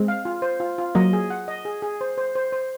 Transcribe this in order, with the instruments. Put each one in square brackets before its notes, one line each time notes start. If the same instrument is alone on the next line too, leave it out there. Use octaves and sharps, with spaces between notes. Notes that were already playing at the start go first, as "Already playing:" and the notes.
Already playing: [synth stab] G#3 C4
[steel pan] F5
F4
C5
F4
F4
[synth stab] F#3 A#3 [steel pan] D#5
[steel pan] G#4
F#5
D#5
G#4
G#4
C5
C5
C5
C5